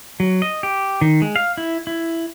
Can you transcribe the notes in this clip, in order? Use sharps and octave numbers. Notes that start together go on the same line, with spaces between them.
F#3
D#5
G4
D#3
G#3
F5
E4
E4